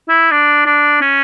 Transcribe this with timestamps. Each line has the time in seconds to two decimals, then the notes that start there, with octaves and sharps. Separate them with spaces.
0.09 E4
0.31 D4
0.66 D4
1.01 C#4